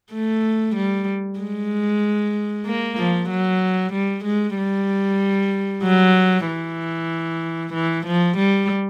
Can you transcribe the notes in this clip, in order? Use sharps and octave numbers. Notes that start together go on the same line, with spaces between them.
A3
G3
G#3
A#3
F3
F#3
G3
G#3
G3
F#3
E3
E3
F3
G3